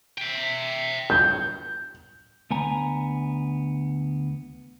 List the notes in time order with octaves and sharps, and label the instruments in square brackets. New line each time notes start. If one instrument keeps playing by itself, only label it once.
[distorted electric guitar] E5 G5
[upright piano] G6
[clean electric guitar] D2 B3 G#5 A#5